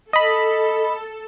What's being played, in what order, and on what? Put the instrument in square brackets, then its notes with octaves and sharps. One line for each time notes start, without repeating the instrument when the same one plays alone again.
[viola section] A4 [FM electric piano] D#5 B5